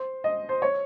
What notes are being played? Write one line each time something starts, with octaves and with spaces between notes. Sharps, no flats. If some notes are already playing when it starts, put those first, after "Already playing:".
Already playing: C5
D#5
C5
C#5